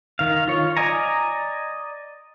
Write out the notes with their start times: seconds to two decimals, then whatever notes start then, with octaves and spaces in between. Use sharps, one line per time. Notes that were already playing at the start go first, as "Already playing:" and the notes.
0.19 D#3 F5
0.48 F4 C#5
0.77 D5 D#5 G#5 A#5